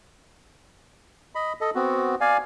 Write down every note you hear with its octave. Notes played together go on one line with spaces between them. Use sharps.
D#5 B5
A4 D#5
B3 C4 F#4
D5 F5 G#5